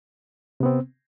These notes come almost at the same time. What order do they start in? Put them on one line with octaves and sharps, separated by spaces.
C3 B3 C4